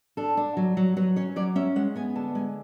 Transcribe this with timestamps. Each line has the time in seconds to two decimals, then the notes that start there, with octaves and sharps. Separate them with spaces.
0.17 D4 A4
0.37 D4
0.57 F#3
0.77 F#3
0.97 F#3 B4
1.16 C#4 C#5
1.36 F#3 D5
1.56 C#4 E5
1.76 G#3 F#5
1.96 B3 G#5
2.15 D3 A5
2.35 G#3 G#5